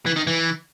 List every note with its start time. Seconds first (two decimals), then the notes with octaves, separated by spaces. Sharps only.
0.06 E3
0.16 D#3
0.27 E3